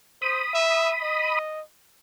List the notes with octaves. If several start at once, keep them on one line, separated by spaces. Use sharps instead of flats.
C5 B5 D#6
E5
D#5